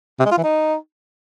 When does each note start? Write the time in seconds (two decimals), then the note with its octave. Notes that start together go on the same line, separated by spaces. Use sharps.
0.20 C3
0.26 G#3
0.32 F4
0.38 E3
0.43 D#4